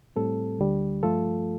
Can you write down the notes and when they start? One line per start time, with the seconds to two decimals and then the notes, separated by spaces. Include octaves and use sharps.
0.16 A2 G3 C4 A4
0.59 D2 D3 G3
1.03 G2 F3 A3 F4 A4